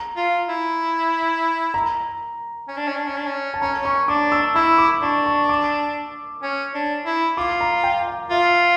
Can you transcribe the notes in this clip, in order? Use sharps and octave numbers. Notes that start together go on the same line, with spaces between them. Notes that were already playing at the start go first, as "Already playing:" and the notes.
Already playing: A#5
F4
E4
A#5
C#4
D4
C#4
D4
C#4
D4
C#4
A5
C#4 A#5
C#4 C#6
D4 D6
E6
E4 E6
D6
D4 C#6
C#6
D6
C#4
D4
E4
F4 D6
A#5
G5
F5
F4 E5